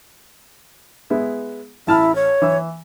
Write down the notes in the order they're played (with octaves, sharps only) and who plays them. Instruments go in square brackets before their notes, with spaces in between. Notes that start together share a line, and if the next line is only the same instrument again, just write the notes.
[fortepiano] G#3 B3 E4
[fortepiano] A1 A5 F6 [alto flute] E4
[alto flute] C#5
[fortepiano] E3 E6